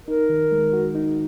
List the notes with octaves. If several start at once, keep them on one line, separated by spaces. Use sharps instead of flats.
D#4 A#4
D#3
G#3
F#4
D#4